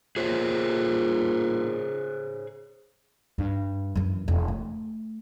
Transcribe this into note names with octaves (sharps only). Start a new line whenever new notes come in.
A#2 G#4 C5 C#5
G2
F#2 E3
E1
A3